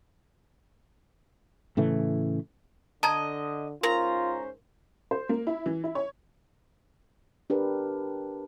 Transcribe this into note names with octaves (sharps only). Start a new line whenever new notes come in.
A2 C#3 E3 A3
D3 D#5 A5 A#5 G#6
G#2 C#4 F4 A#4 C5 A#5
C5
A#3
E4
E3
E4
C#5
D4 G4 A#4 B4